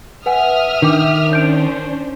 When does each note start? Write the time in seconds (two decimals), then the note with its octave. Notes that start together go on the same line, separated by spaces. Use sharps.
0.26 B4 E5 F#5 G#5 D#6 F6
0.82 D#3 D4 D6
1.33 C#4 D4 C5 G6 D7